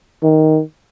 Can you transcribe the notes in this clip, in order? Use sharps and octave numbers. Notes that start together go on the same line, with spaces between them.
D#3